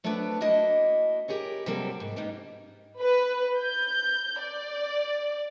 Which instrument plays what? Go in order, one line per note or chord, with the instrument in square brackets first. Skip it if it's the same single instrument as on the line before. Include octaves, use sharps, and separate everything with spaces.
[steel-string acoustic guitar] F#3 A3 B3 C4 D4 B4
A#3 D4 E4 F#4 D#5
G4 G#4 A#4 C#5
C3 F#3 G3 A#3 C4 A4
G#2
G3 G#3 A#3 B3 D#4
[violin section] B4
G6
D5